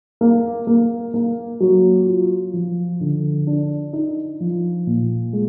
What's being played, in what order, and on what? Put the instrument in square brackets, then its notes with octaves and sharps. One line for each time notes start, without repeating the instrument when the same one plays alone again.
[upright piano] A#3
A#3
A#3
F#3
F4
F3
D3
D4
D#4
F3
A#2
G#3